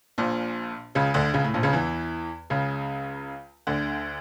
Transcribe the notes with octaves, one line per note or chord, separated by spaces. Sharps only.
A#1 A#2
C#2 C#3
D2 D3
C#2 C#3
A2
A#1 A#2
C#2 C#3
E2 E3
C#2 C#3
D2 D3